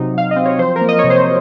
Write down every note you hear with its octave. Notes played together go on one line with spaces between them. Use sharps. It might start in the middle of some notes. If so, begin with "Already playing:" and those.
Already playing: C3 F#3 C4 D#4
F#3 F5
D#5
C4
C#5
F3 C5
A#4
A#3
D#5
C#5
C3
C5